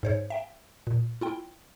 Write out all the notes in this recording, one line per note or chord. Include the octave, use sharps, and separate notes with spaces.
G#2 C5 C#5
E5 G5
A#2
E4 F4 G5